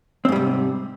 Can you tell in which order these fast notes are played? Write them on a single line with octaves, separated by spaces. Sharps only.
C4 G#2 G3 C3